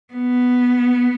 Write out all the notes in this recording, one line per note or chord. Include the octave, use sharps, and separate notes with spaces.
B3